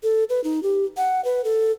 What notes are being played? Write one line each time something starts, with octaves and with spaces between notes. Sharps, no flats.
A4
B4
D#4
G4
F#5
B4
A4